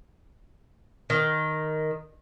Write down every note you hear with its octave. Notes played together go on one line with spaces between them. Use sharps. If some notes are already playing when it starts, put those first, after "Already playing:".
D#3